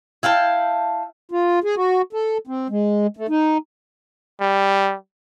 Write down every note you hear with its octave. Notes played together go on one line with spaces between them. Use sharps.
E4 F5 G5 A5
F4
G#4
F#4
A4
C4
G#3
A3
D#4
G3